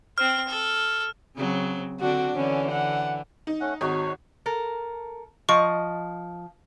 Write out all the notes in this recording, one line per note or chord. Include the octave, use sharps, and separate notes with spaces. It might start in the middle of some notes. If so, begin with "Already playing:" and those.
C4 C5 F6
A4
C#3 F#3 C4
D3 C4 D4 F#4
D3 E3 C#4
F#5
D#4
A3 C#4 F#5
G#1 D#4 F#4 C#5
A4 A#4
F3 D#5 C#6